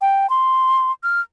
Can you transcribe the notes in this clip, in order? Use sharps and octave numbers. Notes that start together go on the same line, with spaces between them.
G5
C6
F6